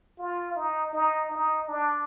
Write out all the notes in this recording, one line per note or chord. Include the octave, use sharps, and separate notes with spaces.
F4
D#4
D#4
D#4
D4